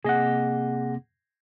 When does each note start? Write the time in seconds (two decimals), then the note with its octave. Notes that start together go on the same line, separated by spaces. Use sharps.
0.05 C3 A#3 G#4 D#5 F#5